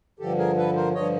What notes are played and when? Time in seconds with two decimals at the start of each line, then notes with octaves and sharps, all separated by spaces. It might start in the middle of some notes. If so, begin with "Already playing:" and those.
0.19 G2 D3 F3 G4 A4
0.38 G#4 A#4
0.57 A4 B4
0.76 A#4 C5
0.94 G2 D3 F3 C#5 D#5